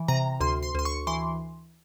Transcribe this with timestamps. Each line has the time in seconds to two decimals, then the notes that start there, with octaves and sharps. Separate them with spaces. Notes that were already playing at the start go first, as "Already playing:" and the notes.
Already playing: E3
0.08 C3 A#5
0.41 D2 C6
0.63 C6
0.75 D2 C6
0.85 C#6
1.07 E3 C6